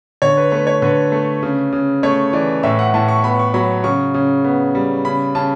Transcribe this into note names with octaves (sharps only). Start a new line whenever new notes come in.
D3 C#5
B4
A3 B4
C#5
D3 B4
A3
C#3
C#3
A3 C#5
E3 D5
A2 E5
F#5
A2 A5
C#6
B3 B5
C#6
F#3 B5
C#3 C#6
C#3
B3
G3
C#3 B5
C#3 A5